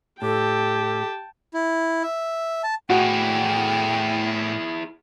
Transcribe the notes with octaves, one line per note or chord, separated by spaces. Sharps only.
A2 G4 A4 G5 A5
E4
E5
A5
A2 E4 F#4 G#4 G5